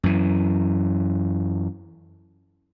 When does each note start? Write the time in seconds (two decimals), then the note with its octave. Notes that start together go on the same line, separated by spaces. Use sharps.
0.03 F#2 E3